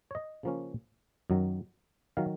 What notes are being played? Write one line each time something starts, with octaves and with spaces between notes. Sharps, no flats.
C#5
D#5
C#3 F3 A#3 C#4
F#2 D#3 F#3
D#3 F#3 F5